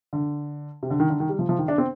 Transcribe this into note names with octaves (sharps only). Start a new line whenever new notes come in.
D3
C3
D3
D#3
D3
D#3
G3
F3
F3
D#3
D4
C4